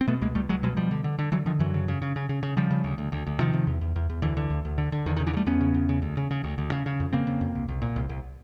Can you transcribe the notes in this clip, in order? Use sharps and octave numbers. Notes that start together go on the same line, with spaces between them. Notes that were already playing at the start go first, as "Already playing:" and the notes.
C4
B2 A3 B3
C#2 G#3 A#3
C#2 G3 A3
C#2 F#3 G#3
B2 F#3 G#3
B2 F3 G3
D3
D3
D3
D3 E3 F#3
D3 D#3 F3
F#2 E3 F#3
C#3
C#3
C#3
C#3
C#3
C#3
C#3 F3 G3
C#3
D2
D2
D2
D2
C3 D#3 F3
C3
E2
E2
E2
E2
D2 D3 E3
D3
D2
D2
D3
D3
E2 D#3
D#3
C#3
D3 E3
C#3
G3 A3
E2 B3 C#4
C#3
E2
C#3
D2
C#3
C#3
D2
D2
C#3
C#3
F2
C#3 A#3 C4
C#3
F2
C2
C2
A#2
C2
C2